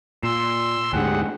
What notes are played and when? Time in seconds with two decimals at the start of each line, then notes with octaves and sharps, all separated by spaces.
0.23 A#2 C6 E6
0.93 D2 G#2 D3 G4 G#4 F#5